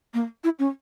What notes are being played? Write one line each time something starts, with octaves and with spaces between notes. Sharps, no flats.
A#3
E4
C#4